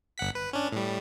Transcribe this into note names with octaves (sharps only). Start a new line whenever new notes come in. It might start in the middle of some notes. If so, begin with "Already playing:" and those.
G1 F#5 B6
B4
C#4 D4
A2 G3